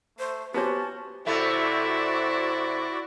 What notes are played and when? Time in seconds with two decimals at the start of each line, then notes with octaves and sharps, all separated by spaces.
0.19 A3 C5
0.54 B3 C#4 F#4 G4 C5 A5
1.26 C3 A3 E4 F#4 D5